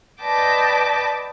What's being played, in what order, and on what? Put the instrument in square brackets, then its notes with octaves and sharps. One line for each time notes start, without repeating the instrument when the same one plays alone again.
[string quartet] B4 D5 D#5 G5 A5 D6